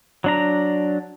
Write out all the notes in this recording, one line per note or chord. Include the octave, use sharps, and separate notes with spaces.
F#3 D4 A#5